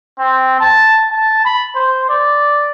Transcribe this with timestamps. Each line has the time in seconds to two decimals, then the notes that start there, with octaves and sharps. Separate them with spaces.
0.19 C4
0.60 A5
1.11 A5
1.45 B5
1.76 C5
2.09 D5